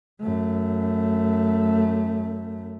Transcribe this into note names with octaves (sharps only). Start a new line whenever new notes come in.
F#2 A3